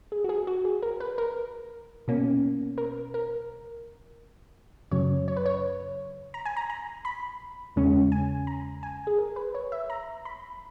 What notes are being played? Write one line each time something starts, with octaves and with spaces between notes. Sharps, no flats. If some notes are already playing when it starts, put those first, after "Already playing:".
G#4
F#4
G#4
F#4
G#4
A#4
B4
A#4
B2 A#3 C#4
A#4
A#4
F#2 C#3 F#3 C#5
C#5
B4
C#5
A#5
G#5
A#5
A#5
B5
E2 C#3 G#3 C#4
G#5
A#5
G#5
G#4
A#4
B4
C#5
E5
A#5
B5